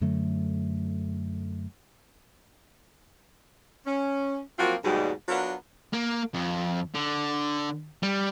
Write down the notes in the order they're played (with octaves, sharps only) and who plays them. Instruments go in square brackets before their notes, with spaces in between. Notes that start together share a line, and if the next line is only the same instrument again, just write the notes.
[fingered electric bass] F#2 D3 F#3 A3
[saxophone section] C#4
F3 F#3 A#3 C4 F4 F#4
D#2 G#2 B2 F#3 G3
F#3 B3 D4 F4 A#4
[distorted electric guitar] A#3
F2
D3
G3